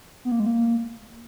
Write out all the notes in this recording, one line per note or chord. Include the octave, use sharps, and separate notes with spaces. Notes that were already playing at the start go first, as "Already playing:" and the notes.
B3
A#3
G#3
A#3